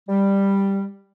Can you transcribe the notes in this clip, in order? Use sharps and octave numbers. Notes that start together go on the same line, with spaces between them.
G3